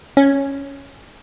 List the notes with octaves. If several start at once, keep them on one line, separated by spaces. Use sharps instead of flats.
C#4